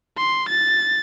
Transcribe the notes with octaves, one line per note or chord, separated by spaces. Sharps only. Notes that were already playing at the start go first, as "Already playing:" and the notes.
C6
A6